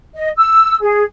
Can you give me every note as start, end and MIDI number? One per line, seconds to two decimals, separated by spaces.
0.15 0.29 75
0.36 0.76 88
0.81 1.03 68